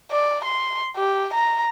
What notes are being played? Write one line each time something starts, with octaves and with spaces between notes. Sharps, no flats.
D5
C6
G4
A#5